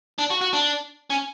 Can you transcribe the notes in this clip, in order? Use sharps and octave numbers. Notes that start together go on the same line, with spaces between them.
D4
F#4
F#4
D4
C#4